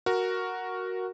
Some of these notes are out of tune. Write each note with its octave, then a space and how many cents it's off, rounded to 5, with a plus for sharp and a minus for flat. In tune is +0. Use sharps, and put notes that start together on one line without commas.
F#4 +0 A#4 +0